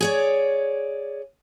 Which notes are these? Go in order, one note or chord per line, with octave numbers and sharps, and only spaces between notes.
G#4 C#5 D5